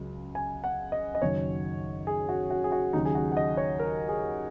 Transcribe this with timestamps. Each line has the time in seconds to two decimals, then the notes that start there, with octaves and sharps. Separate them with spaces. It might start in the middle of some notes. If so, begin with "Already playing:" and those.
Already playing: C#2 C#3 F#3
0.35 G#5
0.64 F#5
0.92 D#5
1.15 D#5
1.22 F#1 F#2 D#3 F#3 C#5
2.07 G#4
2.29 F#4
2.50 F#4
2.64 G#4
2.72 F#4
2.93 D#2 C#3 F#3 D#4
3.06 G#4
3.15 F#4
3.32 F#5
3.37 D#5
3.57 C#5
3.79 A#4
4.09 G#4